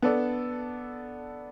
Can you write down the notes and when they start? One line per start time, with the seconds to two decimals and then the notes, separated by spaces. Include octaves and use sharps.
0.02 B3 D4 A4 D5